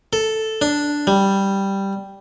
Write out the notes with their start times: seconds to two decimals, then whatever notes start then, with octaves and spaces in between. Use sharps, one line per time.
0.13 A4
0.62 D4
1.07 G3